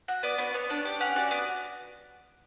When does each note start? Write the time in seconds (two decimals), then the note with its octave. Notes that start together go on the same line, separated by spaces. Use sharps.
0.08 F#4
0.23 B3 D5
0.38 B3 C#5
0.54 B3 C#5
0.69 D4 C#5
0.85 G4 D5
1.01 C#4 F#5
1.16 F#4 D5
1.31 B3